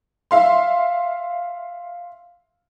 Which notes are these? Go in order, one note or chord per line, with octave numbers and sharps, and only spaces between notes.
E5 F5 C6